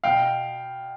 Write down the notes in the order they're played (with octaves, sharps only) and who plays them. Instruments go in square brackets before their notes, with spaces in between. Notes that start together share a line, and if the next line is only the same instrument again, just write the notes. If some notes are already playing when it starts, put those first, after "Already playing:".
[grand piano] B2 F5 G5